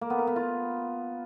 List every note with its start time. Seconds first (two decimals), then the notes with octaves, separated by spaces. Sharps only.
0.01 A#3
0.10 B3
0.19 A#4
0.27 B3
0.36 F4